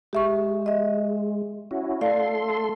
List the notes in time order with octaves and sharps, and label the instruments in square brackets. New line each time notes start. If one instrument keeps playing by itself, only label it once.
[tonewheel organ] G#3 [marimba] G4 E5 C#6
[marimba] D#5 E5
[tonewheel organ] C#4 E4 F#4
[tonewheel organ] A3 A4 C6 [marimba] D5 F5